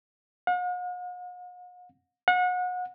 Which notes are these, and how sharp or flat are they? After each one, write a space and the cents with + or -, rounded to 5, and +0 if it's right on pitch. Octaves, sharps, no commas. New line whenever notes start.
F#5 -45
F#5 -30